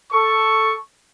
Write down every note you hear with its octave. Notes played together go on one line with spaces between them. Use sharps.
A4 C#6